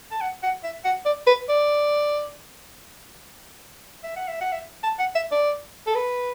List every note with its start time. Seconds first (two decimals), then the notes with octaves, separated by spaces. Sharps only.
0.12 A5
0.21 F#5
0.43 F#5
0.64 E5
0.85 F#5
1.06 D5
1.27 B4
1.49 D5
4.03 E5
4.16 F#5
4.28 E5
4.41 F#5
4.53 E5
4.84 A5
4.99 F#5
5.15 E5
5.32 D5
5.87 A4
5.96 B4